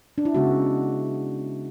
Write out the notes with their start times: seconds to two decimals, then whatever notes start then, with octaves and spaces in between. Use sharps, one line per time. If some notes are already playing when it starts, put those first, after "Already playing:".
0.18 D4
0.25 E4
0.35 C#3 G#3 B3 F#4